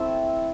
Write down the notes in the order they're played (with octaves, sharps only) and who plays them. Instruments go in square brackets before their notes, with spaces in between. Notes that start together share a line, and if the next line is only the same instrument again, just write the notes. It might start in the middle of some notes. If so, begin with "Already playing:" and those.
Already playing: [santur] A3 C4 E4 A5